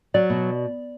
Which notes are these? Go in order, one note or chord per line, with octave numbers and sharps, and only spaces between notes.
F#3 D5
B2